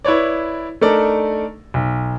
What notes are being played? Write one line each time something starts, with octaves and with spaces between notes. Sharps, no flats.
E4 B4 C#5 D5
A3 D4 D#4 A4 A#4 D5
B1